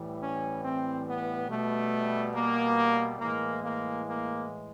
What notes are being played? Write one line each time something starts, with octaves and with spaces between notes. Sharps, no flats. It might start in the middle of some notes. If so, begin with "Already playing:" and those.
Already playing: A2 E3 G3
C#4
C4
B3
B2 G3 A3
A#3
A2 E3 G#3 A#3
A#3
A#3